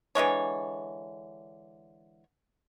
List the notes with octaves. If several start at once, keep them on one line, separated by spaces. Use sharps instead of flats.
D3 E3 G#3 C#5